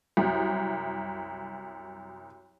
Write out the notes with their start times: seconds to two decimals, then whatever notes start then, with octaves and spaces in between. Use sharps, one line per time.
0.17 C2 F#2